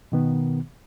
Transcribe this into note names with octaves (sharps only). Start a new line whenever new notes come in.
B2 D#3 B3